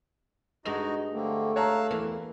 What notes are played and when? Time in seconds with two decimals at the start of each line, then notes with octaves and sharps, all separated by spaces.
0.65 G2 G#3 D#4 F#4 D#5 F7
1.14 D3 A3 A#3 C4
1.56 C#5 F5 A5 A#5 E6 F#6
1.91 E2 E3 A#3